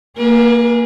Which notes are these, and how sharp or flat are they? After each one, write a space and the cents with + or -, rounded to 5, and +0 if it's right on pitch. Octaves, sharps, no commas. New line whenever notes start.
A#3 -5 G#4 +0 B4 -45